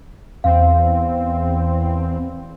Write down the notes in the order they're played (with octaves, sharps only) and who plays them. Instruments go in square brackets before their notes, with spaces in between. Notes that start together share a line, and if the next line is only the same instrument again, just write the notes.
[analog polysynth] E2 C4 [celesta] F5